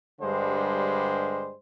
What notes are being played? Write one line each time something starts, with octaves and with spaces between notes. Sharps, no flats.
G2 D3 G3 G#3 C5